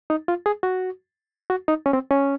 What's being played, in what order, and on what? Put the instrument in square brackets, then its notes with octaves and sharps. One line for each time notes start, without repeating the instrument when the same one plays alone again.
[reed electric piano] D#4
F4
G#4
F#4
F#4
D#4
C#4
C4
C#4